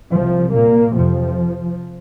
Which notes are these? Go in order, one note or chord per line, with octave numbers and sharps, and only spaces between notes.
C2 C3 F3
A#2 A#3
F2 C3 F3